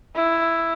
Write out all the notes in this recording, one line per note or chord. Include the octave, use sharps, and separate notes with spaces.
E4